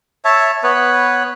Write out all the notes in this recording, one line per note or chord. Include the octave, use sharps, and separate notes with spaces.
C#5 E5 A5
B3 B4 C#5